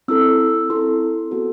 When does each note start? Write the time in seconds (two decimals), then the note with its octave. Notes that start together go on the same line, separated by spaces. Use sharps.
0.08 C4 E4 A4 E6
0.70 C4 E4 A4 C6
1.31 B3 F#4 A4